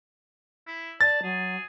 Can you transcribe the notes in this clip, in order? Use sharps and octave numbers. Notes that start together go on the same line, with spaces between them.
E4
D5 A5 A6
F#3 G#4